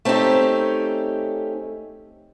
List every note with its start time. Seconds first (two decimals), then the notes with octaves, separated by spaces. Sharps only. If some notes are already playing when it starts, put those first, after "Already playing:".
0.05 A3 C4 C#4 D#4 G4